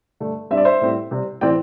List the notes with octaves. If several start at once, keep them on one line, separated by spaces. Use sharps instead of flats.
G2 D3 A3
G2 G3 C4 E5
D5
C5 E5
A2 G3 C4
C3 G3 C4
A2 E3 C4 D5 G5